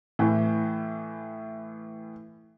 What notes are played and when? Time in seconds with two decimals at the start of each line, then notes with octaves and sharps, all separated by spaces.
0.19 A2 E3